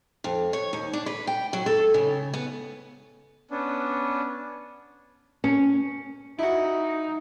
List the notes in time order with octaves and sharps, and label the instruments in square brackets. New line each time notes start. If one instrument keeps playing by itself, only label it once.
[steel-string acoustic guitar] F2
C#5
D#2
D4
B4
G5
F#3
A4
C#3
B3
[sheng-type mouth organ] B3 C#4 D4
[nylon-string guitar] C#4
[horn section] D#4 [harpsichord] E4 F#4